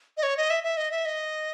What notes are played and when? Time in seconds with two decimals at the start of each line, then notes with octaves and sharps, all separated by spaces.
0.17 D#5
0.23 C#5
0.37 D#5
0.50 E5
0.64 E5
0.77 D#5
0.91 E5
1.05 D#5